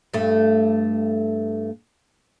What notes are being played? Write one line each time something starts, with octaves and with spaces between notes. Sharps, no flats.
G2 A3